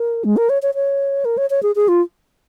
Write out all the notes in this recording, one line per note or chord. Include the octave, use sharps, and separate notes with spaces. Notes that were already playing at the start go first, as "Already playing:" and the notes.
Already playing: A#4
G#3
A#4
C#5
C#5
C#5
A#4
C#5
C#5
G#4
G#4
F4